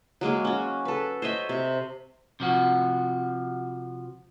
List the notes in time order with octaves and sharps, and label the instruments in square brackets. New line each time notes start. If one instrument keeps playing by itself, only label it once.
[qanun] F#3 G#3 A#3 G#4
C#4 F#4
A4 B4
C5 C#5 D#5 E5
C3
[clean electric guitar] C3 F3 F#4